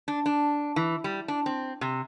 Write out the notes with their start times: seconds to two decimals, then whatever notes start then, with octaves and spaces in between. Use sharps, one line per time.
0.08 D4
0.26 D4
0.76 E3
1.04 G3
1.28 D4
1.46 C4
1.81 C3